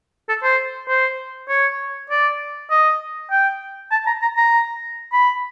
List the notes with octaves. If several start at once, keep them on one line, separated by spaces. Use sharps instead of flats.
A4
C5
C5
C#5
D5
D#5
G5
A5
A#5
A#5
A#5
B5